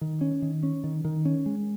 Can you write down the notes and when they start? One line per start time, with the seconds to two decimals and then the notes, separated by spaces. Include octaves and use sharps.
0.01 D#3
0.21 C#4
0.42 D#3
0.63 C#4
0.84 D#3
1.05 D#3
1.25 C#4
1.46 G#3